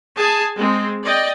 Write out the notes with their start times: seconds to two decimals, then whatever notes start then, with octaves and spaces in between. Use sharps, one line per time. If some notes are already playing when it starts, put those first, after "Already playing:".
0.17 G#4 G#5 A5
0.57 G#3 C4
1.04 D5 D#5 G5